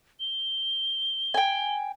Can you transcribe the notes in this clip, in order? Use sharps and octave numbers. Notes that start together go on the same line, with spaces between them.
G7
G5 G#5